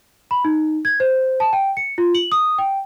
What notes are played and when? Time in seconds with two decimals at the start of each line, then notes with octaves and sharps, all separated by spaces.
0.31 B5
0.45 D#4
0.85 G#6
1.00 C5
1.40 A5
1.53 G5
1.77 C#7
1.98 F4
2.15 F#7
2.32 D#6
2.58 G5